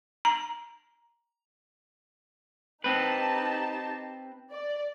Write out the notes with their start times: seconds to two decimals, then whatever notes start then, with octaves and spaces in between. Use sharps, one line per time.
0.25 A#5
2.84 C4 D#4 G4 B4 A5
4.51 D5